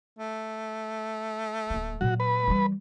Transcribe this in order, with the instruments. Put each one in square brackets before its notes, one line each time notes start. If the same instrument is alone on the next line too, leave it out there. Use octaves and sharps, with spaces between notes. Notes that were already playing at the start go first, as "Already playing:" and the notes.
[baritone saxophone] A3
[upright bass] D1 A#3
[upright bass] A#2 F#3 [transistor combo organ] F#4
[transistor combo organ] B4
[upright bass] E3 G3